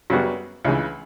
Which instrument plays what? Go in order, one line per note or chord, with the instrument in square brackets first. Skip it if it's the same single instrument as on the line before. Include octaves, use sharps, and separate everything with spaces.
[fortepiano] F#2 C#3 G3 B3 F#4
C#2 C#3 E3